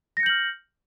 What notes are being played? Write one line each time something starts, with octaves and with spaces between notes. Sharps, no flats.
F6 G6 A#6 C#7 F#7